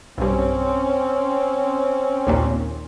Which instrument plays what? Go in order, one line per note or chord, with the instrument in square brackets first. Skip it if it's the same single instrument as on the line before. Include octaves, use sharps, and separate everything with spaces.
[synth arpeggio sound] B1 G2 [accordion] C4 C#4
[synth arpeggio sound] A#1 D#2 A#2